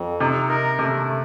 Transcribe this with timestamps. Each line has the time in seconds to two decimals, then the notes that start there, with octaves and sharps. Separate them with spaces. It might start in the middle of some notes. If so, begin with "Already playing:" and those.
Already playing: F2
0.20 C3 D#4
0.49 A#4
0.79 C3 A3
1.08 A3